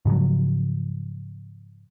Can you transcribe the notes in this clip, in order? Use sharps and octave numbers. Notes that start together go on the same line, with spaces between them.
G#2 C#3 F3 F#3